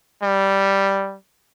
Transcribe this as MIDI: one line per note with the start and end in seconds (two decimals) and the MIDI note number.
0.23 1.16 55